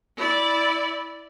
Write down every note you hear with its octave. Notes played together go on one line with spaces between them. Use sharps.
E4 D5